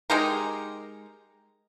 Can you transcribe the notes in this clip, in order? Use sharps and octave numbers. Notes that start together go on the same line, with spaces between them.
G#3 D#4 G4 A#4